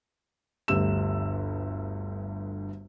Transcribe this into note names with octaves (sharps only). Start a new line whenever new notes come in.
G1 D2 G2 G4 E6 E7